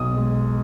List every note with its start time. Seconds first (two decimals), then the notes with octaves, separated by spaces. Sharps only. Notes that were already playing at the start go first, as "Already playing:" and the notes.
Already playing: B1 D#6
0.17 G#3